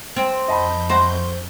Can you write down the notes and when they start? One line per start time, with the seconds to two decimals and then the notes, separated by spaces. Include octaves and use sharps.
0.16 C4
0.48 F2 D#5 A5 B5 G6
0.89 F#4 C5